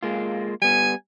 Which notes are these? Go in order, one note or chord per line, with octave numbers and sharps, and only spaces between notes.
G#3 A#3 F4
G3 B3 G#5